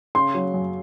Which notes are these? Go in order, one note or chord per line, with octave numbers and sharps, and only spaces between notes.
C#3 C6
F#3
F#2